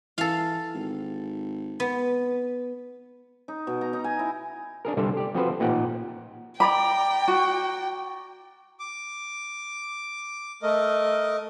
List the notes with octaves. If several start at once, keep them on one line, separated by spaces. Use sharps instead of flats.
E3 A4 F5
G#1
B3
D#4
B2
A#5
D#4
G#5
E4
D4 G#4 A#4
C2 G2 D3 G3 A4 C5
G4 D5
F3 C4 F#4 A4 B4 C5
A1 A#2 D#4 G4 F#5 G5
D5 G5 A#5 B5 D6
F#4
D6
A3 A#4 D#5